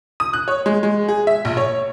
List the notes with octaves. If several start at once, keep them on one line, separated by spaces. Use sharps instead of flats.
D#6
F#6
C#5
G#3
G#3
G#4
E5
A#1
C#5